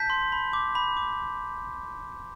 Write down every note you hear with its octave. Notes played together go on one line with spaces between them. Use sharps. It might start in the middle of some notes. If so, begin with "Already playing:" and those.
Already playing: A5 G6 B6
C6
B5
D6
B5
D6